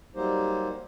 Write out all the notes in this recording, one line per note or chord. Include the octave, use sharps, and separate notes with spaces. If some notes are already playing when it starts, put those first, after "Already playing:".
F#3 G3 A#3 D#4 G4 C5